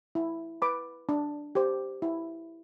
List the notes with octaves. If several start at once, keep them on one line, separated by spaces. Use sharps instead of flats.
E4
B4 B5 D6
D4
G4 C5
E4